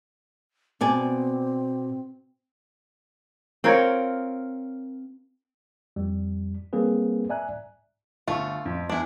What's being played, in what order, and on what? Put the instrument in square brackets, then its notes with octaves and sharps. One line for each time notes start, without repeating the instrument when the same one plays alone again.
[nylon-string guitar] B2 D5 G#5 [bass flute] C4
[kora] C4 F4 A#4 C#5
[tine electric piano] F2 G3
G3 A#3 C4 G#4 B4
D5 E5 G#5 A#5 F#6
[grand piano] G1 C#6 [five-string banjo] A3 F4
[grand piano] F2
[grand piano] E2 [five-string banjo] D4 E4